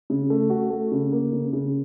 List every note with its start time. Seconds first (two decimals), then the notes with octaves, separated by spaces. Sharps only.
0.10 C#3
0.30 A3
0.50 F#4
0.70 A3
0.92 C#3
1.12 A#3
1.33 C#3
1.53 C#3